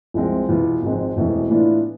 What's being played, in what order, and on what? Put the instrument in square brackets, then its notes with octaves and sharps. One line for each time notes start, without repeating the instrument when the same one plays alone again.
[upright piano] C2 C3 F3 G#3 C4
E1 E2 B2 B3 F4
G#1 G#2 F3 G#3 C4
E1 E2 B2 A3 C4
A2 E3 B3 D4 F4